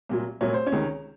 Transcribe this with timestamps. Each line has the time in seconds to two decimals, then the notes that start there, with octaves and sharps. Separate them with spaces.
0.09 C2 A#2 F#3
0.41 C2 A#2 F#3 A3 C#5
0.54 C5
0.66 C#4 C#5
0.72 C#2 C3 D#3